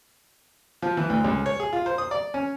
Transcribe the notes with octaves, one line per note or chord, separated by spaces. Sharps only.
F3
E3
D2
C#2
C#5
G#4
F4
C5
D#6
D5
C#4